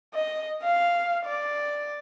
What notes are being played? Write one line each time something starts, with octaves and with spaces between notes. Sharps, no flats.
D#5
F5
D5